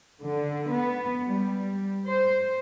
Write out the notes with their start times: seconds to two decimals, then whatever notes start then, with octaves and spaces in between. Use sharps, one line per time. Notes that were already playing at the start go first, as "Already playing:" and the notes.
0.21 D3
0.70 B3
1.27 G3
2.06 C5